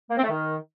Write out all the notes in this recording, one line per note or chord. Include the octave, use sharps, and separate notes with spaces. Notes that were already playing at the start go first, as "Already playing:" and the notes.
A#3
C4
A3
D#3